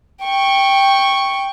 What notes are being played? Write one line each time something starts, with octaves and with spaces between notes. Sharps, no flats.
G5 C#6